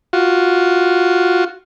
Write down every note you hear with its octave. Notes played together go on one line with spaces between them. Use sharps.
F4 F#4